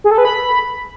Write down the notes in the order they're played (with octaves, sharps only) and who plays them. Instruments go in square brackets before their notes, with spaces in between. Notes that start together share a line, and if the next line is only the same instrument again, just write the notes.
[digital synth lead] G#4
A4
B4
B5